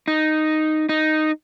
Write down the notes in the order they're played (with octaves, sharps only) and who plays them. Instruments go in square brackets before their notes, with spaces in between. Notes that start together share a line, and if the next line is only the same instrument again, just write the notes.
[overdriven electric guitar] D#4
D#4